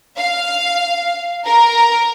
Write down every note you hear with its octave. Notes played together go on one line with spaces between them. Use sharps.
F5
A#4